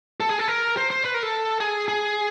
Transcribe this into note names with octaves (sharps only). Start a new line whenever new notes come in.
A4
G#4
A4
A#4
C5
C5
B4
A#4
A4
G#4
G#4